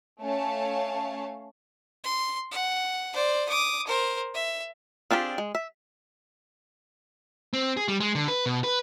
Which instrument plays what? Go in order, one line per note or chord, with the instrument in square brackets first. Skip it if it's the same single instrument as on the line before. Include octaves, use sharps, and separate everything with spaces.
[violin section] A3 C#4 C#5 F5 A5
[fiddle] C6
F#5
C5 D5
D6 D#6
A#4 C5
E5
[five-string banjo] C4 D4 F4 G4 G#4
G#3
E5
[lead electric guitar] C4
G#4
G3
G#3
D3
B4
B2
B4